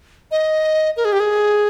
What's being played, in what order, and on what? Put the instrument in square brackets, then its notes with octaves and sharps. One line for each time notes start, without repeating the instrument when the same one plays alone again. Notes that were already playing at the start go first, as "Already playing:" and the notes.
[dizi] D#5
A#4
G#4
G4
G#4